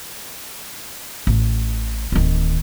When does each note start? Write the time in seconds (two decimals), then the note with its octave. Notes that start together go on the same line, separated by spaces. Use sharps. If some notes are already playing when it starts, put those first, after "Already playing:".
1.27 A1
2.12 D1 D#3